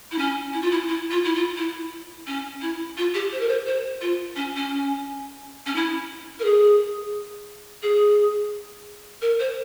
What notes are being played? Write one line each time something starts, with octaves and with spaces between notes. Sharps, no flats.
E4
C#4
E4
F4
E4
E4
F4
E4
F4
E4
C#4
E4
F4
G4
C5
A#4
C5
C5
F4
C#4
C#4
C#4
E4
A#4
G#4
G#4
A#4
C5